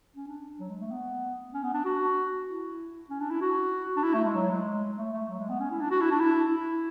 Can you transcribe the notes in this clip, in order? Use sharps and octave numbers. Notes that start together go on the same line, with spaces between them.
C#4
D4
F#3
G#3
A3
B3
C#4
B3
D4
F#4
E4
C#4
D4
E4
F#4
D4
E4
A3
G#3
F#3
G#3
A3
A3
F#3
G#3
B3
C#4
E4
D4
F#4
E4
D4
E4
E4